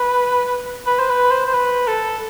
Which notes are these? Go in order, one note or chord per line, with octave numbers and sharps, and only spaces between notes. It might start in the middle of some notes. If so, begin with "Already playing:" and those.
Already playing: B4
B4
C5
B4
C5
C5
B4
A4